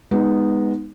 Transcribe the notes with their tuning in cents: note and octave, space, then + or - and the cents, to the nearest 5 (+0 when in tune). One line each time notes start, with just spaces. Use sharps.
G#3 -20 B3 +0 D#4 +0